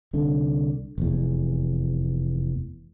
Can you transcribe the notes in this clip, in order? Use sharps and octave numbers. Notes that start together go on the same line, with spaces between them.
C2 D3
F1 E2